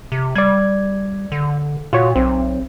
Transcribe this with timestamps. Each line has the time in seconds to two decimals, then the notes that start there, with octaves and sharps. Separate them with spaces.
0.12 C3
0.36 G3 D5 G#6
1.32 D3
1.93 A#2 F4 F#4 C#5
2.16 B1 C4